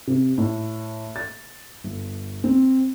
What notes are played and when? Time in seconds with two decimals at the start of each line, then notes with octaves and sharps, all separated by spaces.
0.07 C3
0.38 A2
1.16 A6
1.84 G1
2.44 C4